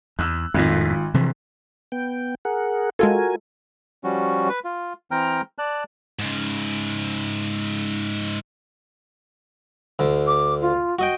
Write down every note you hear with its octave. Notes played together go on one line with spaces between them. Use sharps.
E2 E6 F#6
G#1 F2 A2 F4
C3 E3 F3
B3 G5
G#4 A#4 F#5
G#3 F4 F#4 A4 A#4 G#5
F3 G3 C#4 F#4
B4
F4
E3 C4 G5 A#5 F6
D5 A5 F#6
G#2 C#3
D2 D3
D6
F4
F#4 D#5 G5